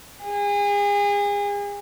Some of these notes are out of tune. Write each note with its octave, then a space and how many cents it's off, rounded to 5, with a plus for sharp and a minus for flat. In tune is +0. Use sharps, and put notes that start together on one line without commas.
G#4 -35